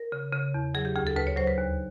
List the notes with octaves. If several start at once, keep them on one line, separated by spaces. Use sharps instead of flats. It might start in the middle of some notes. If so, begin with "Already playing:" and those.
Already playing: A#4
C#3
C#3
E2
F#3 G#4
G4
D2 G#4
A4
D2 B4
C#5
F#3 C5
B4
D#2